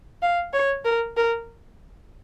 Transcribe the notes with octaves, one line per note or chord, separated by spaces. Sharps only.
F5
C#5
A#4
A#4